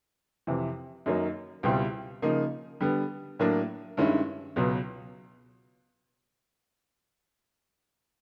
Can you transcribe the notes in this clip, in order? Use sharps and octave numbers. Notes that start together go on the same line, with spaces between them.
F2 C3 E3
F#2 D#3 F#3 A#3 D#4
C#2 B2 G3 C4 E4
C#3 F3 A#3 D#4
D3 G3 B3
A2 F#3 A#3 D4
G2 D#3 G#3 C#4 E4
C#2 B2 F#3 B3